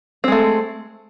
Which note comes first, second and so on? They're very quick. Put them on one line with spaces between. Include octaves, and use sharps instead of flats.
C4 G#3 A3